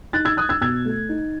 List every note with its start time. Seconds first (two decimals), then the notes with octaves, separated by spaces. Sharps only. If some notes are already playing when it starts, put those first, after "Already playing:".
0.13 D#4 F#6 A6
0.25 E6 G#6
0.37 D#4 D#6 F#6
0.49 E6 G#6
0.61 B2 E6 G#6
0.85 A3
1.09 D#4